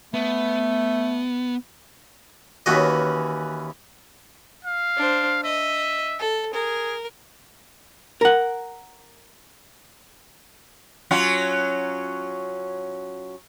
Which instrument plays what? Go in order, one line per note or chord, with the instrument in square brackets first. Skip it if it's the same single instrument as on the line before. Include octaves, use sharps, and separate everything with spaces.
[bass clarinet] A3 [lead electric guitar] B3
[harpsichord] D#2 F#4 D#5 [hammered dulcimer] E3 C#4
[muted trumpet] F5
[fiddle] D4 C5
[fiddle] D#5 [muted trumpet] E5
[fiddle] A4
[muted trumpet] G#4 [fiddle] A#4
[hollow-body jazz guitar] A#4 F#5
[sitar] F#3 C#4 F4